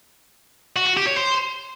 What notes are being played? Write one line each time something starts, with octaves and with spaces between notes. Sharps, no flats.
F#4
F#4
G4
C#5
C5